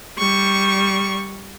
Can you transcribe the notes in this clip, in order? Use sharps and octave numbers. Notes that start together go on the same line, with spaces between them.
G3 C#6